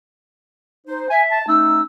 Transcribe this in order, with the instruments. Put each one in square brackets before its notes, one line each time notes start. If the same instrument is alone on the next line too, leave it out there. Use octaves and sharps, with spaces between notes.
[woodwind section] D#4 C5
[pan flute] E5 [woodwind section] G#5
[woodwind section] A5
[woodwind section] A3 C#4 D#4 [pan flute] E6